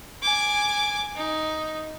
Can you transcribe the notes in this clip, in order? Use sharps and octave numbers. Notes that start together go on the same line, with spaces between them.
G#5 D6
D#4